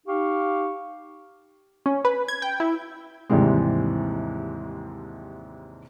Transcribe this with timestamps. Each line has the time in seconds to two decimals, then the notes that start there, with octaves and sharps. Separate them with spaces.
0.07 D#4 G4 F5 C#6
1.86 C#4
2.05 B4
2.28 G#6
2.42 G5
2.60 E4
3.30 D#2 G#2 C3 E3 G3 G#3